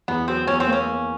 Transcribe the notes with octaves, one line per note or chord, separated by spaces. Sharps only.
E2 B3
F#3 C4
E2 C#4
C4
A#3
C#4
A#3